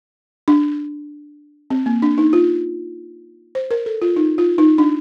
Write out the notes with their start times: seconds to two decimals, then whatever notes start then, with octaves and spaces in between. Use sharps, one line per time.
0.48 D4
1.70 C4
1.86 A#3
2.02 D4
2.18 D#4
2.33 F4
3.55 C5
3.71 A#4
3.86 A4
4.02 F4
4.16 D#4
4.38 F4
4.58 D#4
4.78 D4